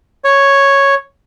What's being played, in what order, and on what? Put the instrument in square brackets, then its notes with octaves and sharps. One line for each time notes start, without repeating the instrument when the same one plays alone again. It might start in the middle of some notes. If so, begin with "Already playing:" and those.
[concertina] C#5